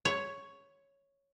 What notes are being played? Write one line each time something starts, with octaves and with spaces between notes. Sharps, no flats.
C#5